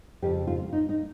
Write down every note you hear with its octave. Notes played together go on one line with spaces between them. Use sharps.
F2 C#3 F3 G4
F4
D#4
D#4